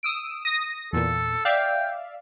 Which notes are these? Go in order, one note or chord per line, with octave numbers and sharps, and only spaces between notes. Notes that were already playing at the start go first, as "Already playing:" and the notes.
D#6 E6 D7
D#6 A#6
E2 A#2 A4
D5 E5 F5 G5